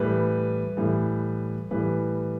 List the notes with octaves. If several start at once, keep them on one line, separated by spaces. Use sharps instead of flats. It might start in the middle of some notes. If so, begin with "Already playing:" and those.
Already playing: A2 E3 G3 B4
A2 E3 G3
A2 E3 G3 B4